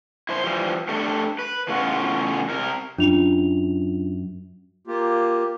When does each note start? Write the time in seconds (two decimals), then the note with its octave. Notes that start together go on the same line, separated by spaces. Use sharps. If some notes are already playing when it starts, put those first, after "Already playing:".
0.29 E4 C5
0.44 E3 F3 G3
0.89 A3 D4 G4 A4
1.39 B4
1.68 E2 A2 C#3 C#4 F4 F#5
2.49 C3 A#4
2.98 F#2 D4 F4 F7
4.87 A#3 F4 G4